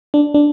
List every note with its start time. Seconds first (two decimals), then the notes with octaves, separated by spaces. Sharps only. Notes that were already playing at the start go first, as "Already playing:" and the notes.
0.14 D4
0.34 D4